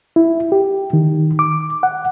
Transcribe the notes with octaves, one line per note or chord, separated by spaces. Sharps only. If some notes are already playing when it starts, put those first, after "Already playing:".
E4
G4
D#3
D6
F#5